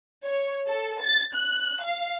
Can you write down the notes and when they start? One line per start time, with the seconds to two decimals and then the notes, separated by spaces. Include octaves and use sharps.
0.24 C#5
0.67 A4
1.02 A6
1.34 F#6
1.83 F5